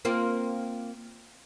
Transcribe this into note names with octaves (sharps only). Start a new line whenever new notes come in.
A#3 C4 F4